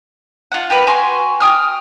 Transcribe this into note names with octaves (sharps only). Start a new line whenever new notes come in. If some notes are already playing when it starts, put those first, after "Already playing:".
F4 F#5
G4 A#4 B4
F#4 G#5 C6
G5 D#6 F6